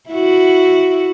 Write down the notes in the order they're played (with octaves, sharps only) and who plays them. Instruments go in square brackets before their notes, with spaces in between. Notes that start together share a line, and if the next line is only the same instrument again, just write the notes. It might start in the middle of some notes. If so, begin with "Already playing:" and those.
[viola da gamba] E4 F#4